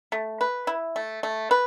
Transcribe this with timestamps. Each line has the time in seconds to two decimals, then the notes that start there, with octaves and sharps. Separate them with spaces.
0.12 A3
0.41 B4
0.67 E4
0.96 A3
1.23 A3
1.51 B4